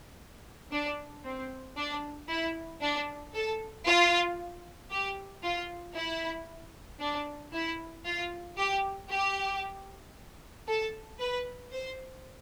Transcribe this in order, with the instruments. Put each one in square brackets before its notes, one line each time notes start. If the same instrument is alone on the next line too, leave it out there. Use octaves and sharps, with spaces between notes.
[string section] D4
C4
D4
E4
D4
A4
F4
G4
F4
E4
D4
E4
F4
G4
G4
A4
B4
C5